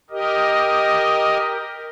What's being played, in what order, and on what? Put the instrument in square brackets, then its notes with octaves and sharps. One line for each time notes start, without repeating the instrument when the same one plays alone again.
[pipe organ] G4 A#4 D#5